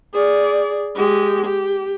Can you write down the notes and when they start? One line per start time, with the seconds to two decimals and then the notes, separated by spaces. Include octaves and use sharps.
0.14 G#4 D5
0.96 G#3 G4
1.45 G4